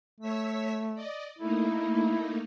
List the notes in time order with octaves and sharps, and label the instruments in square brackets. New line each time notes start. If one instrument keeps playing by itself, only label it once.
[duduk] A3 [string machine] C#5 E6 B6
[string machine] D5 D#5
[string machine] A3 A#3 D#4 [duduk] E4